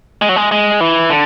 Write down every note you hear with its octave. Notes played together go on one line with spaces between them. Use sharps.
G#3
F#3
G#3
G#3
E3
D3